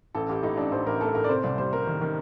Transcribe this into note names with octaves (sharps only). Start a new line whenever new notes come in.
A1 A4
A1 G4
A2 D#4
A1 D4
A1 C5
A1 A#4
A3 A4
A2 A#4
D5
C3 C5
C2 D5
G3 C5
G3 A#4
D#3
D#3